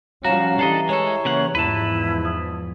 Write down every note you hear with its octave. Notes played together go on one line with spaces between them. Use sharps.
F3 G3 C#4 F#4 F5 A#5 A#6 E7
E3 D4 G4 A4 D#5 A#5 C7
G#3 A4 C#5
C#3 A#3 F#5
E2 G#2 F3 E4 B4 A5
D#6